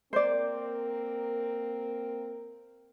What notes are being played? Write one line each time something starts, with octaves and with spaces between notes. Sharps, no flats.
A#3 C4 A#4 C5 D5